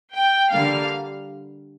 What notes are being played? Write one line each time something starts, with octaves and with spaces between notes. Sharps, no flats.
G5
D3 G3 A#3 F5